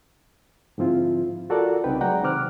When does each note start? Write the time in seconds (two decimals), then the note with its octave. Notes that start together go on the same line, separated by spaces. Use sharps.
0.78 G#2 D3 F3 C4 E4 F4
1.49 F4 F#4 A4 A#4 D5 F#5
1.84 C2 C#3 C4 D#4 B4 G5
2.01 F#3 G#3 D5 F#5 G5 A#5
2.23 C3 D#3 C5 D6 F6 F#6